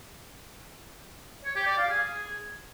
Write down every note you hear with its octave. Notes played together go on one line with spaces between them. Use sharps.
C#5
G4
D5
F5
G#4